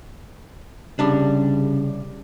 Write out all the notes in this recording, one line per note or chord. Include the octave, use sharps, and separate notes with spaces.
C2 C#3 G3 D4